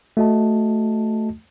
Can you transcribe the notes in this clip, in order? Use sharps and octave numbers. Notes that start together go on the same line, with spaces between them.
A3 F#4 D#5 A5